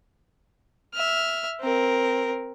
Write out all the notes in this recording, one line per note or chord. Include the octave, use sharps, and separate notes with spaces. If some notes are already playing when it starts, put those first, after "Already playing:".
E5 F6
C4 A#4